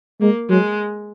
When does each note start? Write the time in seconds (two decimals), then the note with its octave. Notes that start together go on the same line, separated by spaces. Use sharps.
0.21 G#3 A#3
0.50 F#3 G#3